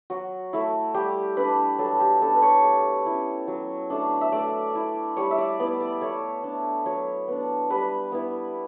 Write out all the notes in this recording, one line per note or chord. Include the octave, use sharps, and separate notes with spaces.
F#3 F#4
A3 E4
G3 G4
D4 B4
F#3 A4
G4
B3 D4 A4
B4
C#5
A3
C#4 E4
F#3
A3 D4
E5
A3 D5
E4
G3 C#5
E5
D5
B3 E4 D5
D5
A3 C#5
D4
F#3 C#5
B3 D4
G3 B4
B3 E4